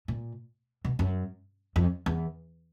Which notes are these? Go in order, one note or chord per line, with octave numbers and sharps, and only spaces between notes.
A#2
B2
F#2
F2
E2